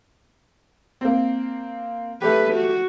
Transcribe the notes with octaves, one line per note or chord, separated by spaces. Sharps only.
A#3 C4
A3 G4 B4
F#4